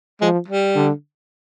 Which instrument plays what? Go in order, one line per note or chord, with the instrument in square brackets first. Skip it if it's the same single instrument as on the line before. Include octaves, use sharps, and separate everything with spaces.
[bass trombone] F3 [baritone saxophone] G#3
[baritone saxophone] G3
[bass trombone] D3